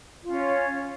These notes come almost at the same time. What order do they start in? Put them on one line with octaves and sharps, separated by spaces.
F4 C#4 C#5